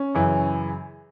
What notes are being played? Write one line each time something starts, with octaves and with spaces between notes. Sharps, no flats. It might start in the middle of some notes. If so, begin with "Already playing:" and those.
Already playing: C#4
F#2 C#3 E3